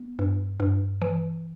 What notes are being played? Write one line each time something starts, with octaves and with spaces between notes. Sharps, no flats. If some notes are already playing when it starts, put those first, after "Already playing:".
Already playing: B3
G2
G2
E3